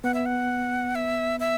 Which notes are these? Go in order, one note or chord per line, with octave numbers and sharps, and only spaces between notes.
B3 F#5
E5
F#5
E5
E5